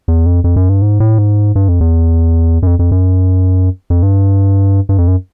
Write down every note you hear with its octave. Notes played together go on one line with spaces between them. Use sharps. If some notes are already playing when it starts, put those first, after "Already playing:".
E2
F2
F2
F#2
G2
G#2
A2
G#2
G2
F2
E2
F#2
F2
F2
F#2
F2
G2
G2
F2
F#2